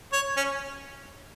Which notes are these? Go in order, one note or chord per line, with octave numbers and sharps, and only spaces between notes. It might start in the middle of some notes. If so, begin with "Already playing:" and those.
C#5
C#4